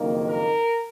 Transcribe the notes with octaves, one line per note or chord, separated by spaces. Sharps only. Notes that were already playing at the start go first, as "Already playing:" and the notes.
Already playing: F#1 F2 D#3 A#3
A#4